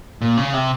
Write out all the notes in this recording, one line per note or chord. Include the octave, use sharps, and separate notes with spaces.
A#2
C#3
C3